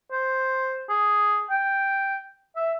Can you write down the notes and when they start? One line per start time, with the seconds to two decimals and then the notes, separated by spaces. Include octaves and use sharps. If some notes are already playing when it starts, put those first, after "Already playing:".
0.11 C5
0.89 G#4
1.50 G5
2.56 E5